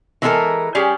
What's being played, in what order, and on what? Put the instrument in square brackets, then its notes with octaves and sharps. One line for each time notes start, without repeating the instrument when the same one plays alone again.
[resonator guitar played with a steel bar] E3 G#3 C#4 D#4 A4 A#4
G3 C#4 G4 G#4